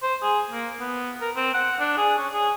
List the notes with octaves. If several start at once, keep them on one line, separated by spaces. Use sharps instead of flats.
C5
G#4
A#3
B3
A#4
C4
F#5
D4
G#4
C#4
G#4